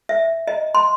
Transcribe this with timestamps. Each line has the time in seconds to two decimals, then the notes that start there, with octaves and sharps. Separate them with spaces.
0.09 E5
0.47 D#5
0.75 C6